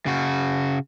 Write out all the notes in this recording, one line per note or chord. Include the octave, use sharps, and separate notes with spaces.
C#3 F#4